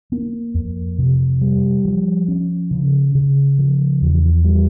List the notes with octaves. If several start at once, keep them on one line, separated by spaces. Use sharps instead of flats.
A#3
F2
C3
G3
F3
C#4
C#3
C#3
F3
E2
G3